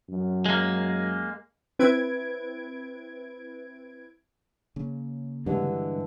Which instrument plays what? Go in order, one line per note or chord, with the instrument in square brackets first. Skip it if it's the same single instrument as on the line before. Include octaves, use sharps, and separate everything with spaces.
[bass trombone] F#2
[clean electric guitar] G#3 A#3
[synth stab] C4 E4 B4 G#6 D7
[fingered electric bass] C#3 A#3 C#4
[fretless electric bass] G2 G3 [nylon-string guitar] D3 E3 G#3